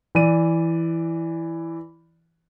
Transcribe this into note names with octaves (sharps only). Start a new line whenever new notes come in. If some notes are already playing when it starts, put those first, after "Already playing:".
E3 D5 D#7